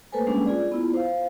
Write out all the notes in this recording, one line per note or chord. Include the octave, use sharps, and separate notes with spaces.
A3 A#3 A4 B4 C5 G#5
G3 G#3 A#3 C#4 D4 G#4
F4 G#4 D5
B3 E4 F4
C5 F5